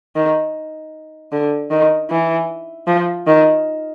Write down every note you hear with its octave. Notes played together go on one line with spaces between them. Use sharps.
D#3
D3
D#3
E3
F3
D#3